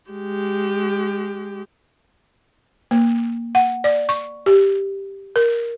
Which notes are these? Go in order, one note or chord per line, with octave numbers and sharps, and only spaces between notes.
G#3 G4
A#3
F#5
D5
C#6
G4
A#4